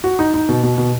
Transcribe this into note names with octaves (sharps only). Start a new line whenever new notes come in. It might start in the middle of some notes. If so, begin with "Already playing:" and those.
F#4
D#4
D#4
B2
B2
B2